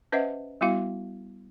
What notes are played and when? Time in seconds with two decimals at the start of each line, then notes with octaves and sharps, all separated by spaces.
0.12 C#4 B4 C5 D#5 E5 F#5
0.61 G3 B3 E4 F#4 F5